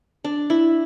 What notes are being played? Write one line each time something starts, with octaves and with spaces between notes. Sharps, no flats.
D4
E4